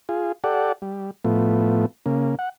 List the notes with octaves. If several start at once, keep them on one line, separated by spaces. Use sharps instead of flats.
F4 G#4
G4 A4 D5 F#5
G3
A2 F3 A3 B3
C#3 A#3
F#5